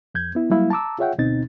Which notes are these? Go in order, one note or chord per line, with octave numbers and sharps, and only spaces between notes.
F2 G6 G#6
B3 E4
F#3 G3 A#3 E4 F5
A5 A#5 D6 E6
F4 G#4 C#5 E5 F#5 G5
D2 B2 C4 D#4 A6